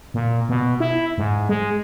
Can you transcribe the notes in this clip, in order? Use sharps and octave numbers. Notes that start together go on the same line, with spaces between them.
A#2
B2
E4
G#2
G#3